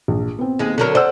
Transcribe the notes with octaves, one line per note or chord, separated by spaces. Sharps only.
A#1
B3 C4
D#2 G#3
D3 F#3 A#4
C5 D5 F#5 E6